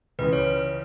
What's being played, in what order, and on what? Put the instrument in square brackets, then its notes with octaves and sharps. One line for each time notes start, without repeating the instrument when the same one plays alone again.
[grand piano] C#2 C#3 E3 [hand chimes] B4
[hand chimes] C#5